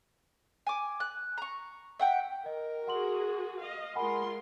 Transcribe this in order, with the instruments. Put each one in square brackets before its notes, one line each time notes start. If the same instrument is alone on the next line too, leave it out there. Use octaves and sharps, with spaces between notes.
[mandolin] G#5 D6
F#6
A#5 C#6
E5 F#5 G5
[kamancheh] A#4 [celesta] D#5
[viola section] F#4 G#4 [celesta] F#5 C6 F#7
[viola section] D#5 F5
[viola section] G#3 F4 C6 [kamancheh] A#4 [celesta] F#5 G#5 B5